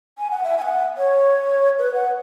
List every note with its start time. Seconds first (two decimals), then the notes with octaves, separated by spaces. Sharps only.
0.18 G#5
0.31 F#5
0.44 E5
0.58 G#5
0.62 F#5
0.97 C#5
1.78 B4
1.94 F#5